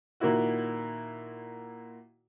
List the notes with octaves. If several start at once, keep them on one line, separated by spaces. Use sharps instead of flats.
A#2 D#3 A#3 E4 F#4